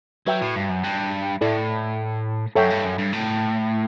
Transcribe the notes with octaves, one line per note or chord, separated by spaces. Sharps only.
F#3 F#4 B4 E5 G5
A2
G2
F#2
G2
A2 E4 A4 D5
F#2 A4 C#5 E5 G5
G2
F#2
G2
A2